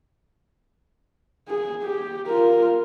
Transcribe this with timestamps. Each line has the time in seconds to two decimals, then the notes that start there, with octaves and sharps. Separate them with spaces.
1.49 G#4
1.84 G4
2.27 F4 A#4